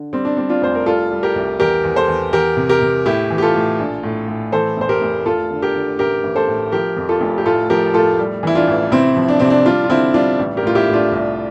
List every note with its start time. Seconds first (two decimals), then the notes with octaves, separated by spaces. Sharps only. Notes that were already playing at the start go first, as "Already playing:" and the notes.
Already playing: D3
0.13 G3 C4
0.25 D4
0.37 G3 C4
0.49 D4 F4
0.62 F1 C5
0.75 A#4
0.86 G3 F4 A4
1.11 G3
1.23 G4 A#4
1.36 C2
1.60 E2 G4 A#4
1.84 E2
1.96 A4 C5
2.08 E2
2.32 E2 G4 A#4
2.57 C3
2.69 G4 A#4
2.81 C3
3.06 A2 E4 G4
3.30 E3
3.38 G4
3.42 F4 A4
3.55 A2
3.79 A#1
4.03 A2
4.28 A2
4.52 E3 A4 C5
4.77 F1 C5
4.89 G4 A#4
5.02 F1
5.26 F1 F4 A4
5.51 D3
5.62 G4 A#4
5.75 D3
5.99 A1 G4 A#4
6.24 A1
6.36 A4 C5
6.48 A2
6.72 F3 G4 A#4
6.97 F2
7.09 F4 A4
7.21 F1
7.38 G4
7.46 A2 F4 A4
7.70 F3 G4 A#4
7.94 A2 F4 A4
8.19 G3
8.43 E3 E4
8.55 D4 F4
8.68 A1
8.92 C3 C4 E4
9.17 F3
9.28 D4
9.39 C3 C4
9.50 D4
9.65 G3 D4 F4
9.84 F4
9.90 D3 C4 E4
10.14 G3 D4 F4
10.39 A1
10.57 G4 A#4
10.63 A2 F4
10.75 E4 G4
10.88 A2
10.94 D4 F4
11.12 C2